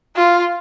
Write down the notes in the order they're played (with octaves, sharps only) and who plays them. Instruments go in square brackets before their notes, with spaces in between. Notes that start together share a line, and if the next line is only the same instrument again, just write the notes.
[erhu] F4